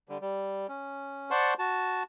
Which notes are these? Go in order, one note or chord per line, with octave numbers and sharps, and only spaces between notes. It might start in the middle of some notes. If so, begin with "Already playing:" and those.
D3 G3
G3
C#4
C5 D5 F#5 A5 C6 C#6
F#4 A5